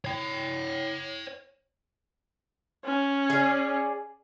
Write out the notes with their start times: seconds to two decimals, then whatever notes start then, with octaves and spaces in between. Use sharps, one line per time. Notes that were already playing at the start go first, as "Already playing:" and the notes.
0.05 C#5 G5
2.84 C#4
3.30 G#4 D5